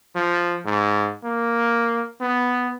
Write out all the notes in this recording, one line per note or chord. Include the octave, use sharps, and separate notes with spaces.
F3
G#2
A#3
B3